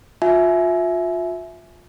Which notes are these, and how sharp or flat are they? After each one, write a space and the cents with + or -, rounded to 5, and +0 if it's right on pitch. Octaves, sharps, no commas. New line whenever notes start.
F4 +30 E5 +0 G#5 +30